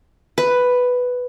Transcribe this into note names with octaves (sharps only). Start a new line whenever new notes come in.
B4